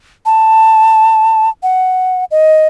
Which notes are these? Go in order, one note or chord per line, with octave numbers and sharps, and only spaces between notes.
A5
F#5
D#5